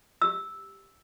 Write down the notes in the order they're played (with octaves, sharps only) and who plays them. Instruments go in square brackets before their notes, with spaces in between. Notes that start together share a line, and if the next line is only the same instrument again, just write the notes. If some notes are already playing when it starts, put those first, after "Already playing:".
[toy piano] G4 E6